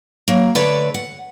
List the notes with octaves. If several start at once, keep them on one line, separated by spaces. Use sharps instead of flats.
F#3 A#3
D3 A3 A4 B4 C#5 D5
F#5